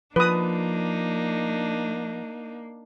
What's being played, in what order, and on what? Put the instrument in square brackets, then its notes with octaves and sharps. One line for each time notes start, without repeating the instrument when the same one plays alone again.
[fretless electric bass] F3 [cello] A#3 [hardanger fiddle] D4 D#4 [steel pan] B4 D#6